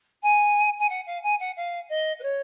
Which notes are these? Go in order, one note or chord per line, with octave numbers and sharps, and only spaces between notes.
G#5
G#5
F#5
F5
G#5
F#5
F5
D#5
B4
C#5